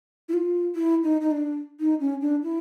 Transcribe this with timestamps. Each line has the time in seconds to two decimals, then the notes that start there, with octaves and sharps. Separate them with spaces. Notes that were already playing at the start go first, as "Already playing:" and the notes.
0.29 E4
0.34 F4
0.75 E4
1.03 D#4
1.21 D#4
1.31 D4
1.80 D#4
2.00 C#4
2.21 D4
2.43 E4